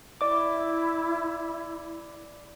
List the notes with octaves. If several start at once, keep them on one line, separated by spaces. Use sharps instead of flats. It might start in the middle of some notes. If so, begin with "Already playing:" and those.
E4 D5 D6